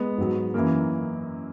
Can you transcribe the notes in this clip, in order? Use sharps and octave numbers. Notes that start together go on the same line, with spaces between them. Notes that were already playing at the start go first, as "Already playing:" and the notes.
Already playing: G#3 B3
G#2 F#3
F#2 E3 A#3